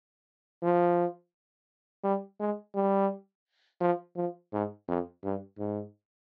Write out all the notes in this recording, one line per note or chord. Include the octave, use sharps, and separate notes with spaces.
F3
G3
G#3
G3
F3
F3
G#2
F2
G2
G#2